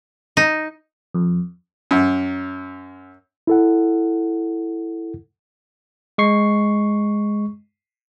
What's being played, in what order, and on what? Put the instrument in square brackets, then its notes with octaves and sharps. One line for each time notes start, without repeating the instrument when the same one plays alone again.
[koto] D#4
[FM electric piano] F2
[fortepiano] F#2
[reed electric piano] E4 A4 F#5
[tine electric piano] G#3 C#6 C7